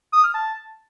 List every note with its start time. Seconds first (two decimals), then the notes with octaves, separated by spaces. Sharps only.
0.13 D#6
0.24 F6
0.34 A5